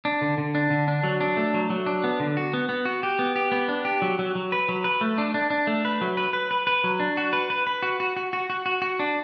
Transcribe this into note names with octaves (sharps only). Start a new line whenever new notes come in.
D4
D3
D3
D4
D3
D4
F#3
D4
A3
F#3
F#3
D4
B3
D3
F#4
B3
B3
F#4
G4
B3
G4
B3
D4
G4
F#3
F#3
F#3
B4
F#3
B4
A3
D4
D4
D4
A3
B4
F#3
B4
B4
B4
B4
F#3
D4
F#4
B4
B4
B4
F#4
F#4
F#4
F#4
F#4
F#4
F#4
D4